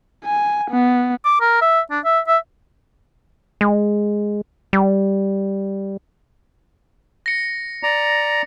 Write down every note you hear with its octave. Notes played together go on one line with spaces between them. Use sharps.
G#5
B3
D6
A#4
E5
D4
E5
E5
G#3
G3
A#6 C#7
D5 A#5